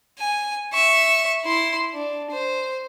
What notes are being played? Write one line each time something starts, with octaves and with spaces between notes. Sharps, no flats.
G#5
E5 C#6
E4 C6
D4
C5